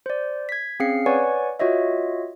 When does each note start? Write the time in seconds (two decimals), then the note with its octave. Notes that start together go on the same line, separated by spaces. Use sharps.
0.06 C5 D5
0.49 G#6 B6
0.80 C4 C#4 G#4 F5 C7 C#7
1.06 B4 C#5 D5 F#5 G#5 C#6
1.59 F4 F#4 C#5 D#5 E5